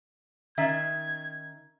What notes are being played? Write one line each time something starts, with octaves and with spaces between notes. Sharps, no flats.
D#3 C#4 E5 G#6